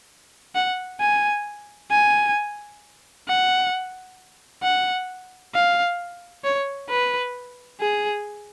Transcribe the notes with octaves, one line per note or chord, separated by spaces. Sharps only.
F#5
G#5
G#5
F#5
F#5
F5
C#5
B4
G#4